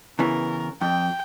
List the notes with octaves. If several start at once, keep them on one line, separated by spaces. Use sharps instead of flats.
C#3 E3 B3 A#4
F2 G5